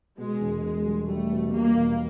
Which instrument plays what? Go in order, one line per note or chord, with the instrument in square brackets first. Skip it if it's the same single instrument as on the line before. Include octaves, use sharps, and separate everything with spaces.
[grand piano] B2 [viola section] G#3
[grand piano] E1
[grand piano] B2 [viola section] G#3
[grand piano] G3
[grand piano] G3 [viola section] A3
[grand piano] B2
[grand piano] G3 [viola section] A#3
[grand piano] E1